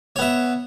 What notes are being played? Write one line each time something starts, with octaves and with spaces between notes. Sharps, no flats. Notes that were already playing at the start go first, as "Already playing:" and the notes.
B3 C#5 E5